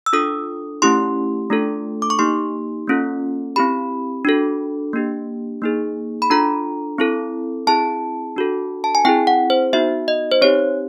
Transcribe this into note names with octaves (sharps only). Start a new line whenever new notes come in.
E6
D4 F4 A4 D#6
A3 C#4 E4 G4 C6
A3 D4 F4 A4
D6
C#6
A#3 D#4 G4 C6
A#3 C#4 F4 A4
C4 E4 G4 B5
D4 F#4 A4
A#3 D4 G4
A#3 D#4 G#4
B5
D4 F4 A4 A#5
C4 E4 A4
C4 E4 G#4 A5
D4 F#4 A4
A5
G#5
C4 E4 G#4 G5
F#5
C5
B3 D#4 F#4 E5
D#5
C5
C4 D#4 G4 C#5